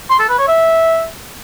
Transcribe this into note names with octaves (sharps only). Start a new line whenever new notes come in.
C6
A4
B4
C#5
E5